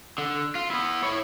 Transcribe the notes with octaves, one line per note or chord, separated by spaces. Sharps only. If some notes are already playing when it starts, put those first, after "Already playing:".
D3
F4
B3 E4
E4 C#5